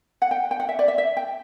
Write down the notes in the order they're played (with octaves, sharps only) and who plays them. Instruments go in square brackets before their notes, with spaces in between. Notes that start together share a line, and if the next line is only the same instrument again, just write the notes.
[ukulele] F#5
G5
G5
F#5
E5
D5
E5
E5
G5